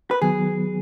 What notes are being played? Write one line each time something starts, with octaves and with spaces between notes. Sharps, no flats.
B4
D#3 F#3 B3 G#4